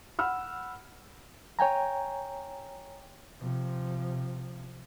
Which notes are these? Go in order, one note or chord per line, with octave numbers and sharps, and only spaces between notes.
F#5 B5 E6 F6
C#5 G5 G#5 A#5
C3 F3